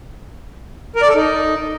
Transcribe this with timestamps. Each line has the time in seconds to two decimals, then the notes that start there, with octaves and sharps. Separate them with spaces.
0.96 A#4
1.02 D5
1.08 A4
1.15 D#4